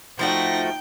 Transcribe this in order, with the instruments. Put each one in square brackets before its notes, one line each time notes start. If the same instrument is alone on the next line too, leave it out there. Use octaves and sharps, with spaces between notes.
[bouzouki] F3 A3 F#4 [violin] D#4 A#6 [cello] G5